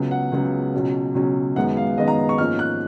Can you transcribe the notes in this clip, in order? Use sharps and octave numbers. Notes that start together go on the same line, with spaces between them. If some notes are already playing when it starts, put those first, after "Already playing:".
Already playing: C#2 C#3 F#3 B3
F#5
C#2 C#3 F#3 B3
C#2 B2 F#3 C#4
C#2 B2 F#3 C#4
F#2 D#3 G#3 B3 F#5
F5
F#2 D#3 G#3 B3 D#5
A#5
C#6
G#2 F3 A#3 C#4 F6
F#6